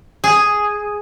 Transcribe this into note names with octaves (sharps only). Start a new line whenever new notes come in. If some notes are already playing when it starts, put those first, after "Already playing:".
G#4